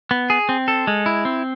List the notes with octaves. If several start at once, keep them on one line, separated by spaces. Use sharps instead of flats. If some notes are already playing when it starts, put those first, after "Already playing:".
B3
G#4
C4
A4
G#3
E4
C4